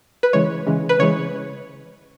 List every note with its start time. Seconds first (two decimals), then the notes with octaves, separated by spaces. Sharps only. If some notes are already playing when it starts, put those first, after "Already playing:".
0.23 B4
0.33 C#3 E3 G#3 C#5
0.67 C#3 E3 G#3
0.89 B4
0.99 C#3 E3 G#3 C#5